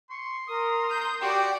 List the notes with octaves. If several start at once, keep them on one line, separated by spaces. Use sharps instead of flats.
C6 C#6
A#4 D#6
G6
F#4 G4 D5 G5 D6